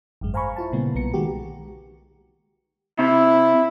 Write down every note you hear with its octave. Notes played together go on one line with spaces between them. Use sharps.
G#1 F#2 G#3
C5 F5 G#5 A#5 B5 C#6
E4 F4 A5
A#2 C#3 G3 A#3 B3
B1 B3 A#5 C#7
D#3 G#3 A#3 F#4 G4
C3 E4